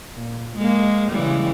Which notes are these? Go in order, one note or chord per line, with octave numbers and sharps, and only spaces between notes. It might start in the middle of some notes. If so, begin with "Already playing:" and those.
A#2
G#3 A#3
C#3 E3 G3